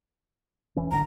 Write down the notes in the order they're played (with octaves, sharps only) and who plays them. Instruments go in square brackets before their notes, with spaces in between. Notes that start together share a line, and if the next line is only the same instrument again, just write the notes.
[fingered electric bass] E1 E3 C#4
[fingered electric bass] D1 G1 D3 [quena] A#5